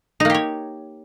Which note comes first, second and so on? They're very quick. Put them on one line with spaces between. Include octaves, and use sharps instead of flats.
D#4 A#3 G4 C#5